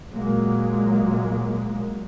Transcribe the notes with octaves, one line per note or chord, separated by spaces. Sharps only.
A#2 F#3 G#3 A#3